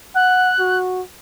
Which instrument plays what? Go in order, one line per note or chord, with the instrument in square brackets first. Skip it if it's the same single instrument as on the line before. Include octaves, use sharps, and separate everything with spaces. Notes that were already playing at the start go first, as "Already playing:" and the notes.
[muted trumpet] F#5 [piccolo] F#6
[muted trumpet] F#4